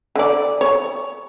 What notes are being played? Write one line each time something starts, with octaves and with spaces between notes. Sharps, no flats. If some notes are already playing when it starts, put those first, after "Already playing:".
D3 D5
C#5